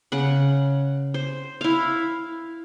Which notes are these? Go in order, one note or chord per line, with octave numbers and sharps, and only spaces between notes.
C#3 F#5
C5
E4 F5